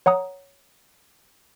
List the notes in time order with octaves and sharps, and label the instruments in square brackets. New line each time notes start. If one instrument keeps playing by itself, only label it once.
[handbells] C#5 F#5 A#5 D#6